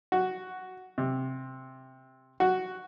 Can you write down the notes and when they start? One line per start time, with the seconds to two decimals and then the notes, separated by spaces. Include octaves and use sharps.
0.12 F#4
0.98 C3
2.40 F#4